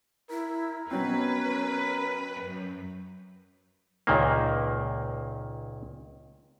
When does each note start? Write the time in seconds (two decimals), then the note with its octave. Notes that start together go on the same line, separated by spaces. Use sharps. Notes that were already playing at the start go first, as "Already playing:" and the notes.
0.30 E4 A#4
0.91 B2 F#3 C4 C#4 B4
2.44 F#2
4.07 C#2 A#2 D#3 A#3